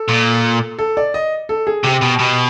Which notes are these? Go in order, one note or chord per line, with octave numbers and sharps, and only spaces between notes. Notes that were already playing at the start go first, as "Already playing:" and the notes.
Already playing: A4
A#2
A4
D5
D#5
A4
G#4
C3 G4
B2
B2